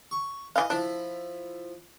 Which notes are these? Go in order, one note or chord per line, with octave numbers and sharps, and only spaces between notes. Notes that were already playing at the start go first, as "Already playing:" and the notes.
C#6
E3 D#5 F5
F3 D4 E4